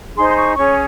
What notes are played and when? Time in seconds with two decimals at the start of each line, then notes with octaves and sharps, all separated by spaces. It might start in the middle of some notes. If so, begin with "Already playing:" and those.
0.16 D#4 G#4 C5 C6
0.29 C6
0.36 C#6
0.56 C#4 G#4 C#5 C#6